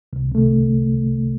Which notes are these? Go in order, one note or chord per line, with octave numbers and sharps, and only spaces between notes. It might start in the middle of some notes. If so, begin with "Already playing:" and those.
C2
C3 A3